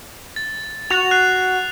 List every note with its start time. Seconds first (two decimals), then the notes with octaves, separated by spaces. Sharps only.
0.36 A6
0.90 F#4 F7
1.11 F#6 C7